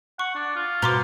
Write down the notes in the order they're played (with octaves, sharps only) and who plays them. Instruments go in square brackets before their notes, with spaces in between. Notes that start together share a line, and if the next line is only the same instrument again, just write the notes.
[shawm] F#5 [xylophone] C#6
[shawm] D4
F4
[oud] B2 [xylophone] A#5 C6 D6